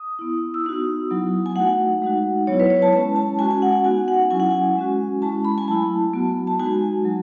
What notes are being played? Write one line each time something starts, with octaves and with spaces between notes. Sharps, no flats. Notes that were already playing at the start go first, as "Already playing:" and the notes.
Already playing: D#6
B3 E4
E6
B3 D#4 F#4 D#6
F#3 B3 E4
G#5
A3 D#4 F#4 F#5
G#3 D#4 F#4
F#3 B3 E4 C#5
B4
C#5
A5
G#3 C#4 E4 A5
A5
G#3 C#4 F#4 G#5
G#5
F#5
G#5
B3 D#4 F#4 G#5
F#5
F#3 C#4 E4 G#5
F#5
G#5
G#3 C#4 F#4
G#3 C#4 E4 A5
B5
G#5
F#3 A3 E4 A5
F#3 B3 F#4
A5
G#3 D#4 F#4 G#5
F#3